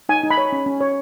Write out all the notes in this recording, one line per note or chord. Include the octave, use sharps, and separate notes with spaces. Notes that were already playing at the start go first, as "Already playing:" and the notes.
D#4 G#5
D#4
B5
C#5
C#4
C#4
C#5